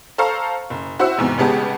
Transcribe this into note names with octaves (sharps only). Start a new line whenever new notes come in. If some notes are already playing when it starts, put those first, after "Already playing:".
A4 C5 F5 A#5 C#6
F#1
E4 F#4 C5 E5 F#5 E6
E2 G#2 C3
A1 C#3 G#3 B3 G4 A5